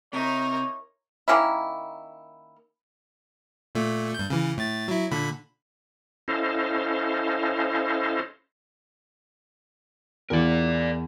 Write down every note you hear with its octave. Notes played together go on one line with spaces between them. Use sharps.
C3 D#4 E4 A#4 C#5
D#3 A#3 C#4 E4
A#2 A3
G2 G6
C#3 E3
A2 A6
F#3 E4
A#2 D3 B5
C#4 E4 A4 C5 D#5 F5
E2 A#4 D5